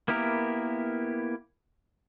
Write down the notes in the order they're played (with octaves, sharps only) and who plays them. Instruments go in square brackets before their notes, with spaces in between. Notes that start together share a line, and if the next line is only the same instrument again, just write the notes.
[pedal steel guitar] A#3 B3 E4 G4 A#4